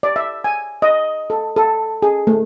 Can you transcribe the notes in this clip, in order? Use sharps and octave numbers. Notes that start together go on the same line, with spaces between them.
D5
E5
G#5
D#5
A4
A4
G#4
A3